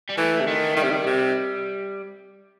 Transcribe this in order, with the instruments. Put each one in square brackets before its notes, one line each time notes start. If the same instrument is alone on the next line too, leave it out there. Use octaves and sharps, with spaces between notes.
[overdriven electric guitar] G3
[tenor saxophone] E3 [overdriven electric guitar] A3
[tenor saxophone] C3
[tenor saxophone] D#3 [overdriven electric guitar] A3
[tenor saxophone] D#3 [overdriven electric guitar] G3
[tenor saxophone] C3
D#3
C3